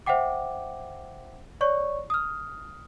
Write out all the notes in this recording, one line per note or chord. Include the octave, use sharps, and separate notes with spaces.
C5 E5 F#5 G5 D6
C#5 D5 C#6
D#6 F6